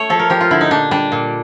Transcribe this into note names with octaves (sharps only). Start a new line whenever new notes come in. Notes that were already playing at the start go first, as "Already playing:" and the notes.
Already playing: A3 C#5
F3 A4
A#4
F3 G4
F4
D3 E4
D#4
A#2 D4
G3 D4
A#2